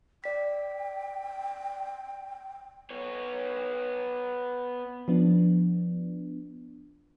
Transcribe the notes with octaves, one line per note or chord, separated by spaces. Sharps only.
D5 G5 B6
B3 C#5
F3 B3 D4